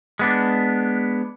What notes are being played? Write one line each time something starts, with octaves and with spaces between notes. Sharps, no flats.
G#3 B3 D4